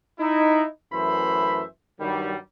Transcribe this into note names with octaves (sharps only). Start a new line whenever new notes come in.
D#4 E4
F#2 E3 A3 C5 E5 B5
G2 D#3 F#3 G3